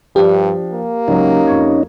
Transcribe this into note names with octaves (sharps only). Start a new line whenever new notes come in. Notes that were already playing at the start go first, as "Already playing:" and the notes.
G2 F3 D4 G4
A#3
C#2 F#3 C#4 D#4 A#5
F2 C#6 G#6